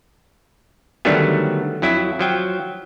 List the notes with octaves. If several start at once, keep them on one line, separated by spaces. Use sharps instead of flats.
D3 D#3 F#3 G3 A3 B3
F2 F#3 E4
F3 F#3 G5